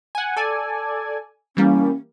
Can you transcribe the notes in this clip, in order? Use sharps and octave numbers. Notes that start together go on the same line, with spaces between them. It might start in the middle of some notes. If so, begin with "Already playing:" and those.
F#5 G#5
A4 D5 G#5
E3 G3 A#3 C#4